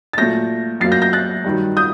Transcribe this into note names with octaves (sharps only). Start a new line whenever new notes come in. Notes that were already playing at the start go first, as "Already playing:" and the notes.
A6
A#2 F#3 A3 G6 A#6
F#2 F#3 A#3 A6 C7
G6 A#6
G6 A#6
F#6 A6
G2 D#3 F#3
D#6 G6